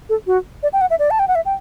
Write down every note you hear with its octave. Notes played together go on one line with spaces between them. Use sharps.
A4
F#4
D5
G5
F#5
E5
D5
A5
G5
F#5
E5
G5